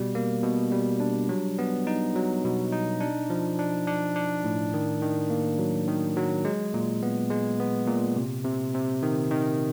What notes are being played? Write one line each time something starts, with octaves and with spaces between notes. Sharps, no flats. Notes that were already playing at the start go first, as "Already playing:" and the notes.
Already playing: B2 G3
A#3
B2
G3
D4
F#3
B3
D#4
F#3
B2
D#4
D4
F3
D4
D4
D4
A2
D#3
D#3
A#3
F#3
D#3
F#3
G#3
A#2
B3
G#3
B3
A#2
C3
C3
C3
D#3
D#3